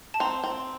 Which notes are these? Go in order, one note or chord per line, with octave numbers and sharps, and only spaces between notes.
A5
C4 A#5
C4